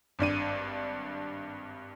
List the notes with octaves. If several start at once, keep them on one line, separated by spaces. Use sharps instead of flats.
G#1 G2 D4 D#7